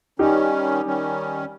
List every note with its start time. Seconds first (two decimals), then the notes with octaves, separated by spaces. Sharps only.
0.19 D#3 G3 C#4 D#4 G4
0.84 D#3 G3 C#4